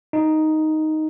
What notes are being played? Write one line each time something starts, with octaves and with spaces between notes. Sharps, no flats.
D#4